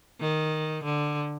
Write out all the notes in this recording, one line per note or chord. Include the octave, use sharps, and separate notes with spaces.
D#3
D3